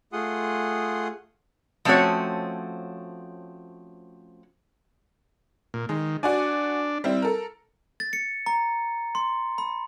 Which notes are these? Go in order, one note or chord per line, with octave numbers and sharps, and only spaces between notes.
A3 F4 G#4 F#5 C6 D#6
F3 A3 C4 C#4 F#4 C#5
A#2
D#3 G#3
D4 F#4 D5 G#5
G3 C4 E4
A4 A#4
A6
C#7
A#5
C6
B5